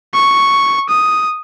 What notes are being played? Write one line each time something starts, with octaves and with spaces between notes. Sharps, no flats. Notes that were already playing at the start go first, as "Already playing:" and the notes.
C#6
D#6